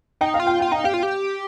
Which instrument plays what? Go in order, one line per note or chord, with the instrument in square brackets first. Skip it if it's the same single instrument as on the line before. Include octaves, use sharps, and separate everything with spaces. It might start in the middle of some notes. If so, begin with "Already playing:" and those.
[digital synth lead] D#4 [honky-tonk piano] G5
[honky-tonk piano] F5
[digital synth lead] F4
[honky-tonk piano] G5
[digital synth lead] F4 [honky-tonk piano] G5
[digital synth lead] D#4 [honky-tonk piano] G5
[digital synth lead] G4 [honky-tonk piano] F5
[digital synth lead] F4
G4